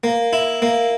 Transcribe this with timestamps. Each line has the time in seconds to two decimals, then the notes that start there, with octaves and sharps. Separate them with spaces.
0.04 A#3
0.33 E4
0.62 A#3